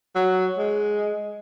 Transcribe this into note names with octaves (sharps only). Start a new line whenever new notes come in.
F#3
G#3